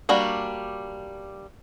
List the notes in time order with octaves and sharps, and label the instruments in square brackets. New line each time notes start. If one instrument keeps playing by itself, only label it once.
[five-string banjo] G3 A#3 D4 F#4